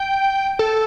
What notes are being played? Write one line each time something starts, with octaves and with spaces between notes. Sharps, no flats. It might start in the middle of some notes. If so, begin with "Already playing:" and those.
Already playing: G5
A4